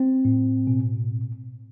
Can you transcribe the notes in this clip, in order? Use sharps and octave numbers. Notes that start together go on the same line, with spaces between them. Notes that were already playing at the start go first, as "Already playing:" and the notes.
Already playing: C4
A2
B2